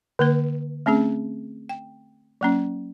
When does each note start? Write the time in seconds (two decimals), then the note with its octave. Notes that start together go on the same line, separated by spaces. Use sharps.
0.19 D3 A#3 B4
0.86 A3 C4 C#4 G#4
1.69 G5
2.41 F#3 A#3 C#4